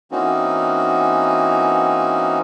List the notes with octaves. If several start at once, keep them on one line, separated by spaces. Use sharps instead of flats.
E3 A#3 C4 C#4 D#4 F#4